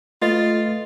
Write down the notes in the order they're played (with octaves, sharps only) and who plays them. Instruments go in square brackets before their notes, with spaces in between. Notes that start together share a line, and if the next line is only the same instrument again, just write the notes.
[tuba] A3 [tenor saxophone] F4 [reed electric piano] B4 D#5 A6